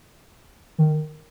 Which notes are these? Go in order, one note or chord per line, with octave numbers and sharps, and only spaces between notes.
D#3